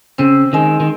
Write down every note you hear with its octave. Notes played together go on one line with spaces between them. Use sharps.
C#3 C4
D#3 G#3
D#3